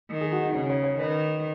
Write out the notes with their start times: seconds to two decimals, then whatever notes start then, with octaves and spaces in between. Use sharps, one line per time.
0.11 D#3
0.21 G#4
0.32 F#4
0.43 D#4
0.54 C#3 C#4
0.70 C#5
0.83 C#5
0.98 D#3 B4